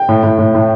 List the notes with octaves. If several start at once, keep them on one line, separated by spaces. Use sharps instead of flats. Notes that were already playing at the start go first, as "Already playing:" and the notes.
Already playing: G5
A2
A2
A2
A2